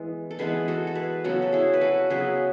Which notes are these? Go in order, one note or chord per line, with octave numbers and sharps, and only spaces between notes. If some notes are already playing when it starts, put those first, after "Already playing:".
Already playing: E3 G#3 B3
A4
E3 G#3 B3 G#4 B4
F#4 A4
A4
G#4 B4
C#3 F#3 B3 F#4 A4
A4
E4 G#4
B4
F#4 A4
C#3 F#3 B3 G#4 B4